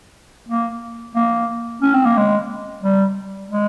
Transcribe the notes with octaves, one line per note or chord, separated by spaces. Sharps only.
A#3
A#3
C#4
C4
A#3
G#3
G3
G#3